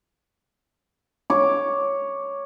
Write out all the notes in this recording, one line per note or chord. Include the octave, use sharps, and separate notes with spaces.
C#5 D6